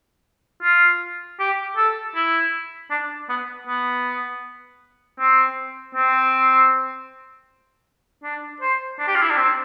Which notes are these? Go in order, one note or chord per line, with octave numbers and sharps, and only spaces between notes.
F4
G4
A4
E4
D4
B3
B3
C4
C4
D4
C5
D4
G4
F4
E4
D4
C4